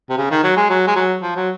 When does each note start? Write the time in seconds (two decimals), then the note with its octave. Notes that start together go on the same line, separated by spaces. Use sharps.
0.10 C3
0.18 C#3
0.31 D#3
0.44 F#3
0.57 G#3
0.70 F#3
0.87 G#3
0.96 F#3
1.22 F3
1.36 F#3